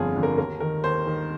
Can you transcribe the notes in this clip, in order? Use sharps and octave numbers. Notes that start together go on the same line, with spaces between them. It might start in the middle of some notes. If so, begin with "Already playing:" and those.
Already playing: G1 F2 D3 F3 F4 G#4
F2 D3 F3
A#4
D#2 A#4
D#3 A#4
D#2 C5
D#3